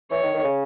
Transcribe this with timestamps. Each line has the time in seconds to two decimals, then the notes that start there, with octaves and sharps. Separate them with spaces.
0.11 E3 C#5
0.23 D#3
0.35 D#3
0.45 C#3